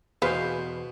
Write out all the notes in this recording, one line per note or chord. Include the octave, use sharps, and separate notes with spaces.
E2 B2 G#4 B4 C5 F5